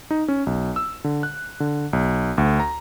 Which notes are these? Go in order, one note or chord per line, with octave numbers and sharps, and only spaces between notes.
D#4
C#4
B1
E6
D3
F#6
D3
B1
D2
A#5